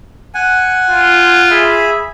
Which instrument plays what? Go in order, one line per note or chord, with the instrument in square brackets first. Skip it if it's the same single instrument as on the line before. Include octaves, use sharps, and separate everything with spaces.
[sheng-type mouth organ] F#5 G#5
[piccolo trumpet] F4
[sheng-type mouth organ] G#4 E5 B5